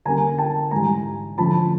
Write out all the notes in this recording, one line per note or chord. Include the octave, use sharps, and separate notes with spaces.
D3 G3 A#3 C#4 G#5 A#5
G5 A5
G#2 E3 G3 G#5 A#5
D3 F3 A3 C#4 A5 B5